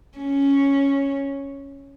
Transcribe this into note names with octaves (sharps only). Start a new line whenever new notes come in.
C#4